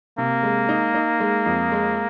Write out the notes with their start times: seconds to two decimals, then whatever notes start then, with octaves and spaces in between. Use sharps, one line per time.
0.18 C3 A#3
0.43 G#3
0.69 D#4
0.94 D#4
1.20 G#3
1.46 F2
1.72 G#3